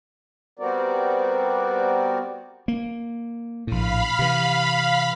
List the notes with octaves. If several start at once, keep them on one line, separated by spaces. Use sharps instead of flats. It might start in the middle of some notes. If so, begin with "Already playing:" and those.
G3 B3 C4 F#4 A#4 D5
A#3
A#1 A2 F5 B5
C3 E3